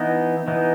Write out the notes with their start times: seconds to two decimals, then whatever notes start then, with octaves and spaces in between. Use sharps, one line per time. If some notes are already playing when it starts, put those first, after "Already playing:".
Already playing: E3 B3 D#4
0.48 E3 B3 D#4